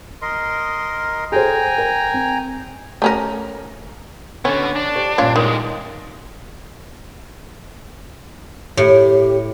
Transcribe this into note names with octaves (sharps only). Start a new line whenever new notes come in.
A#4 D#5 C6
G#4 A4 C5 G5 G#5 A#5
A#4
C4
A3 C#4 A#4
D3 B3 C#4 F#4
D4
G4 C5 C#5
G2 A#2 G3 C#4 F4
C2 D#3 G#3
A2 G4